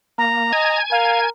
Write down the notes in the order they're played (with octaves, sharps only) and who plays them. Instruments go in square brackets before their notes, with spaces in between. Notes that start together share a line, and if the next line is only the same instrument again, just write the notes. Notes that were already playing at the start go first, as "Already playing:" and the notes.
[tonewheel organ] A#3 [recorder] A#5
[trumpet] D#5 [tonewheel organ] G#5 G#6
[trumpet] A#4 [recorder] F5